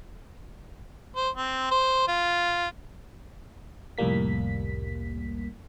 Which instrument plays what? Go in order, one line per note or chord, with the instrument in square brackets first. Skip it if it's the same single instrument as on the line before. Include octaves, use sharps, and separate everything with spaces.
[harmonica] C5
C4
C5
F4
[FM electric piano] C2 F2 A2 G3 A#3 B6